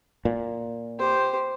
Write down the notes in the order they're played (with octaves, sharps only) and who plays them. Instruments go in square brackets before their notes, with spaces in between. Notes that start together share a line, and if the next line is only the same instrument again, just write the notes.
[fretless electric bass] A#2
[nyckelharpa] G4 C5